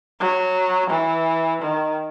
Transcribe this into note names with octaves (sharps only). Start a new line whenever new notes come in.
F#3
E3
D#3